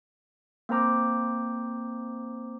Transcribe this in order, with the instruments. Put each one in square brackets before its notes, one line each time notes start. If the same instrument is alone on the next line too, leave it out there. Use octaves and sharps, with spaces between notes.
[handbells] A#3 C4 C5 A#5 D6